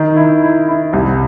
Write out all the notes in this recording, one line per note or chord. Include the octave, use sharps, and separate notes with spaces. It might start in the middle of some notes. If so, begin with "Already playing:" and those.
Already playing: D#3
E4
E4
E4
C2